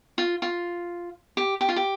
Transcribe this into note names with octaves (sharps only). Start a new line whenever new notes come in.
F4
F4
G4
G4
F4
G4